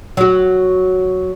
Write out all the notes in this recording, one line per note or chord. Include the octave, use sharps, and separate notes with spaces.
F#3 F#4